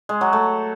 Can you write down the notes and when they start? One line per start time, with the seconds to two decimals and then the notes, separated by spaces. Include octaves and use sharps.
0.09 G#3
0.21 F#3
0.33 A3